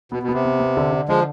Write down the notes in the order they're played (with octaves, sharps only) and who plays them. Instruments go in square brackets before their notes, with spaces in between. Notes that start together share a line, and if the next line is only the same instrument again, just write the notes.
[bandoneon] B2 [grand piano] B3
[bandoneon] B2
[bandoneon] C3 [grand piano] B3
[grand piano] B3
B3
D3
D3
[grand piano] D3 [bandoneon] F3 G#3